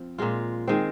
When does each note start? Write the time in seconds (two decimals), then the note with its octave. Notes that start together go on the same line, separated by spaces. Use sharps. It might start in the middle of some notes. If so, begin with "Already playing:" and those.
Already playing: F3 C4
0.18 A#2 G#3 F4
0.68 D#3 G#3 C4